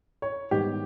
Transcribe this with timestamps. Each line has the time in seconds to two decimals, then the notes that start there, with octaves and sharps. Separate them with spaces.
0.22 C#5
0.51 G#2 D#3 G3 B3 G4